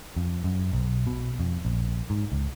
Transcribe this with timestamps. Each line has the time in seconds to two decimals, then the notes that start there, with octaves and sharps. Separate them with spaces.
0.16 F2
0.44 F#2
0.73 B1
1.07 B2
1.39 F2
1.65 A#1
2.10 G#2
2.32 C#2